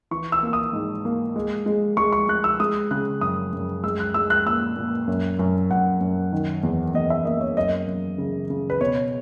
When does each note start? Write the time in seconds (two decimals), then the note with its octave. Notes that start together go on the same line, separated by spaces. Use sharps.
0.11 E3 C#6
0.32 E6
0.43 A#3
0.53 D#6
0.73 G#2
1.05 A#3
1.36 G#3
1.66 G#3
1.97 G#3 C#6
2.13 C#6
2.29 G#3 F#6
2.44 E6
2.60 G#3 D#6
2.91 C#3 F#6
3.21 F#2 D#6
3.53 F#2
3.83 G#3 E6
4.00 F#6
4.14 G#3 E6
4.30 F#6
4.46 A#2 E6
4.77 A#2
5.08 F#2
5.39 F#2
5.71 F#2 F#5
6.01 F#2
6.32 D#3
6.63 E2
6.94 E2 D#5
7.10 E5
7.25 A#3 D#5
7.41 C#5
7.57 F#2 D#5
7.87 F#2
8.18 C#3
8.50 C#3
8.70 B4
8.81 B2 C#5